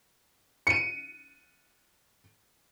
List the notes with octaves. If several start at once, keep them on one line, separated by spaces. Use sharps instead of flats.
C#7 D#7